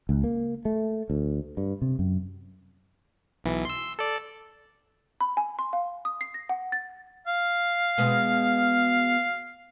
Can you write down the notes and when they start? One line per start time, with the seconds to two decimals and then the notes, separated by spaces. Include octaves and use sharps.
0.09 C#2
0.24 A#3
0.65 A3
1.10 D2
1.57 G2
1.82 C3
1.99 F#2
3.44 B1 E3
3.65 C6 E6
3.99 A4 D5
5.21 B5
5.37 G#5
5.59 C6
5.73 F5
6.05 D#6
6.21 C7
6.34 A#6
6.49 F#5
6.72 A6
7.27 F5
7.98 B2 G#3 B3